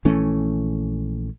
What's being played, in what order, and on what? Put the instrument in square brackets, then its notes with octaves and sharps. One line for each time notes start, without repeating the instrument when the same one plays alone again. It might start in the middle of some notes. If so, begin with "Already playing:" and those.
[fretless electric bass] A#1 E3 A3 C#4